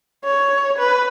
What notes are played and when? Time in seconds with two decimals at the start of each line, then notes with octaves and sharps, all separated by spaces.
0.24 C#5
0.79 B4